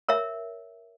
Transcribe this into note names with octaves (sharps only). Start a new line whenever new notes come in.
A#4 C#5 E5